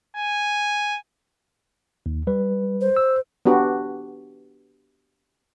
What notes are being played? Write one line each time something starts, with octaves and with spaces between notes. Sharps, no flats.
G#5
D#2
G3 B4
C5
E6
B3 D4 F#4 G4 B4